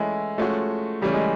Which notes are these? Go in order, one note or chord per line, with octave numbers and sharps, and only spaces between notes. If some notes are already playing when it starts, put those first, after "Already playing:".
Already playing: E3 G#3 A3 C#4 E4 A4
F3 G#3 A3 C#4 F#4
C#3 E3 G3 A3 C#4
G#3